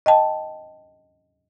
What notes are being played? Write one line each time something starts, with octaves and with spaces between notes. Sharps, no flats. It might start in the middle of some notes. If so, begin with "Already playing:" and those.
D#5 G5 A5